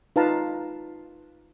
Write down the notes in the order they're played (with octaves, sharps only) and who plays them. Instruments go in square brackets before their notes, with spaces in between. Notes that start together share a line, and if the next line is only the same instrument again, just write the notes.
[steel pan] D#4 F4 B4 F5 A5 A#5